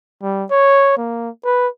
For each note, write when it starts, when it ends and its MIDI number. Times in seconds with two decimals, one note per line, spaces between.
0.22 0.45 55
0.51 0.96 73
0.98 1.29 58
1.45 1.68 71